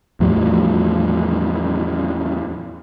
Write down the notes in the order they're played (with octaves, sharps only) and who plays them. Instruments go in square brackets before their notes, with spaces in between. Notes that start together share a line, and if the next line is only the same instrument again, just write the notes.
[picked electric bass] E2 A2 F3 G3